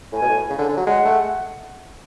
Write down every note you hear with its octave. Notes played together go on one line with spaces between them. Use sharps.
A2 G#5
B2
A2
C#3
D3
D3
F#3
G#3 F#5
A3